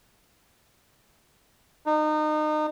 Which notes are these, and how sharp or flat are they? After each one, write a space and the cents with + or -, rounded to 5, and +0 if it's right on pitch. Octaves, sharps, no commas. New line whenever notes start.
D#4 -30